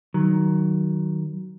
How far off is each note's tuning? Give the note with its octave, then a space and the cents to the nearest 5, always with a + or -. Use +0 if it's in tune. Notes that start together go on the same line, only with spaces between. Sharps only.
D#3 +0 F#3 +15